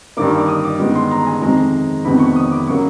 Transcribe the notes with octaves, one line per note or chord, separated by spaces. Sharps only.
G2 D#3 G3 A#3 D6
C#6
D6
D#6
D6
G2 D#3 G#3 B3
C6
A#5
G#5
F2 C3 D#3 G#3 A#5
F2 C3 D#3 G#3 B3 B5
C#6
D#6
D6
C#3 F#3 A#3 C#6